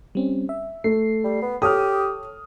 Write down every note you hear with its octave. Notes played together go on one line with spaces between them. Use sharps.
G3 C4 C#4
E5
A3 C7
G3
B3
G4 A4 C#5 D#6 F6